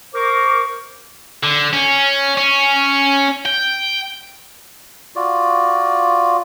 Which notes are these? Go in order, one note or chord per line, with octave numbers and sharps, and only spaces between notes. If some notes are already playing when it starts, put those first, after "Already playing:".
A#4 C5 C#6 D6
D3
C#4
C#4
G5
F4 F#4 D5